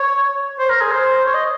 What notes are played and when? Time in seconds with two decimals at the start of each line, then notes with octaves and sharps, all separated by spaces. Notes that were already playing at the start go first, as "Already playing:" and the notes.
Already playing: C#5
0.59 C5
0.70 A#4
0.81 G#4
0.92 C5
1.25 C#5
1.34 D#5